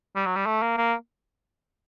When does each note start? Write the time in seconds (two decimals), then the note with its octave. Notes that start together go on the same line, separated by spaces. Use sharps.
0.16 G3
0.26 F#3
0.36 G3
0.46 A3
0.62 A#3
0.77 A#3